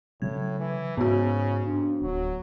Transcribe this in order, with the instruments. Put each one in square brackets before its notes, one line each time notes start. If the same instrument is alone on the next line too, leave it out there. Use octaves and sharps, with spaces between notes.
[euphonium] A2 [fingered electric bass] C#3 F#3 [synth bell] G#6
[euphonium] E3
[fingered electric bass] G#2 [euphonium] C#3 [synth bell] B3 F#4
[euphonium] F2 [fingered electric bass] D4
[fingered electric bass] D1 [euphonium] F#3